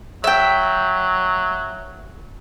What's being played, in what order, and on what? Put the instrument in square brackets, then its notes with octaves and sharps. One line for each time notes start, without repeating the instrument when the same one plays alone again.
[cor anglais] F#3 [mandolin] E5 G5